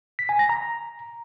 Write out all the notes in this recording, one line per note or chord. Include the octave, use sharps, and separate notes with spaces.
B6
G#5
A#6
A#5